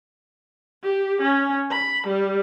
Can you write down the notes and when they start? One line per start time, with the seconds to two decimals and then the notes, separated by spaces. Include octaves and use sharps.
0.83 G4
1.22 C#4
1.71 B5
2.07 G3